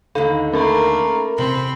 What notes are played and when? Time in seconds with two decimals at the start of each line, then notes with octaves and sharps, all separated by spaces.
0.15 D#2 D3 D#4 A4 F5 B5
0.53 A3 A#3 C#4 A4 A#4 B5
1.38 E2 C3 C4 B5